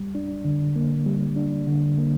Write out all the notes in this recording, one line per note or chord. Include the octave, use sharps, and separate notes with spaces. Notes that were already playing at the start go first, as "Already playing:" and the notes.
Already playing: G3
D4
D3
A#3
G3
D4
D3
A#3